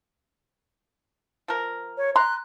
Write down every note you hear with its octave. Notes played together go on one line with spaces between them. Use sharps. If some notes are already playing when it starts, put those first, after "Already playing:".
F3 A#4
C#5
A#5 C6 F#6